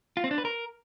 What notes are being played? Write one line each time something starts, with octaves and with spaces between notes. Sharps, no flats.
F4
C4
D4
B4
A#4